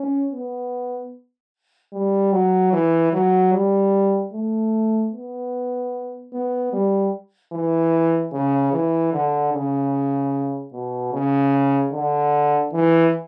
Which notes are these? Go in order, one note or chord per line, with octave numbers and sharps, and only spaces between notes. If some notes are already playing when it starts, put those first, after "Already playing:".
Already playing: C#4
B3
G3
F#3
E3
F#3
G3
A3
B3
B3
G3
E3
C#3
E3
D3
C#3
B2
C#3
D3
E3